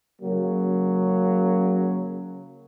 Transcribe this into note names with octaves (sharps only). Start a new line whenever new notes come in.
C#3 F#3 A#3